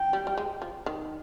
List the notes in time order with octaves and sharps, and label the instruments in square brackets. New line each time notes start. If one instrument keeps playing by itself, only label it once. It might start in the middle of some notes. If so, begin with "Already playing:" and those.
Already playing: [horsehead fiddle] G5
[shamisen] G3
G3
G#3
F3
D#3